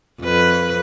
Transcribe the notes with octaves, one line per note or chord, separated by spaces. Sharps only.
F2 B4